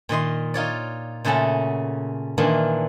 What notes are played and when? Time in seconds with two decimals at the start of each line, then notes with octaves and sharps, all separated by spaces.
0.09 A#2 D#3 D#5 C6
0.54 D#4 F4 C#5 D5
1.24 A#2 C#3 A3 C#4 A4 F#5
2.38 A#2 D#3 E3 A#3 D4